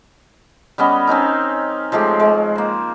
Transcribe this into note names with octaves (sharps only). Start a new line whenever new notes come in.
G3 B3 C#4 D#5
C4 C#4 D#4 A#4
F3 G#3 A3 G4
G#3
A#3 C5